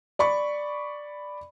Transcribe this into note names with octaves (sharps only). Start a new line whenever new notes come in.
D5 B5 C#6